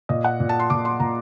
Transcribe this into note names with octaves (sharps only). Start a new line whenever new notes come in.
A#2 D#5
F#5
A#2
A5
C6
A#2 D6
C6
A#2 A#5